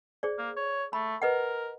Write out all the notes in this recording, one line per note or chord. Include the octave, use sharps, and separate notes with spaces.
G#4 C5 D5
A#3
C#5
A3 B5
A#4 B4 D#5 F#5